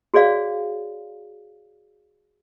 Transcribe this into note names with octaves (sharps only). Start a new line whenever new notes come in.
F#4 G#4 C#5 D5 F5